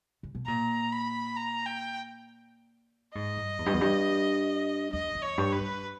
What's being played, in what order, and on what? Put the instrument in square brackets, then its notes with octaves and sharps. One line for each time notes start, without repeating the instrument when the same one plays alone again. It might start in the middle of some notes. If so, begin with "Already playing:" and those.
[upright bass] C#3
B2
[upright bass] A#2 [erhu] A#5
[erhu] B5
A#5
G5
[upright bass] G#2 [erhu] D#5
[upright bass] G2
E2
G2
E2
G2
[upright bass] E2 [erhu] D#5
[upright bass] E2
[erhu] C#5
[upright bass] G2
[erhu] B4
[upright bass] G2